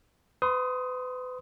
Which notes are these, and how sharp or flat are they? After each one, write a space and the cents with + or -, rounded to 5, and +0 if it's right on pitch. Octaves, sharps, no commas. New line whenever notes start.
B4 +35 C6 +0 D#6 +10